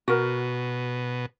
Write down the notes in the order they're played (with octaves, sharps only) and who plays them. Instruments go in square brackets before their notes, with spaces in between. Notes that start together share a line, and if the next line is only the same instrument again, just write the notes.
[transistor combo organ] B2 [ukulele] F#4 A#4